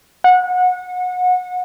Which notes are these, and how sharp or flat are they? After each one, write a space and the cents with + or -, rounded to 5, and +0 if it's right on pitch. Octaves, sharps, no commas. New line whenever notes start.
F#5 -25